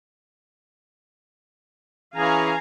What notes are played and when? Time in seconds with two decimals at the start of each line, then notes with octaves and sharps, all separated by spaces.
2.16 E3 C#4 G#4 F5 G#5 A#5